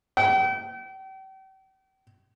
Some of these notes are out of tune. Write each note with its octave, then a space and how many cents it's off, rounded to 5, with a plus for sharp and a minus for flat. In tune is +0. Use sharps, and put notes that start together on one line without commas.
G5 -40